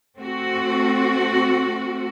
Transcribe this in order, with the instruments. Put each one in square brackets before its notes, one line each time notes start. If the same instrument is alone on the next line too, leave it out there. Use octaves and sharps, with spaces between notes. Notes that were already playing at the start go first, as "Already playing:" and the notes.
[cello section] A3 C4 F#4